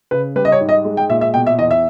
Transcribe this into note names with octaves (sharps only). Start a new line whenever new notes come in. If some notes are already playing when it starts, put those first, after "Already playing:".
C#3 B4
G3 B4
D#5
C#5
G#2
D#5
G#3
G5
A#2 E5
E5
B2 G5
E5
E2 D#5
E5